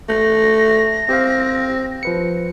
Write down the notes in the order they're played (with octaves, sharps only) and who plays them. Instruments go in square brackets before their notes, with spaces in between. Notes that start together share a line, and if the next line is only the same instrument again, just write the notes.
[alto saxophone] A3 [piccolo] A#6
[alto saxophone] C4 [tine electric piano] G4 C5 F5
[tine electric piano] F3 B4 C#7